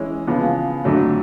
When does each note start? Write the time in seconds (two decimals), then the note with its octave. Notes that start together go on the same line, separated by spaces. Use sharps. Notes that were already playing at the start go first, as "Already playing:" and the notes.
Already playing: E3 G#3 C#4 E4
0.27 C#3 F3 G#3 B3
0.84 F2 D3 F#3 A3